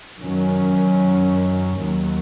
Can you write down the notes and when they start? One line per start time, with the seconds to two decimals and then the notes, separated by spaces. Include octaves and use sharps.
0.21 F#2 D#3 F#3 C#4
1.79 D#2 D#3 F#3